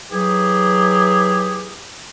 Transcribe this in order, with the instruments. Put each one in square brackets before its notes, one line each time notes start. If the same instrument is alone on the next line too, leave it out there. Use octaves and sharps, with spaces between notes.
[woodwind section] E3 F#3 G4 G#4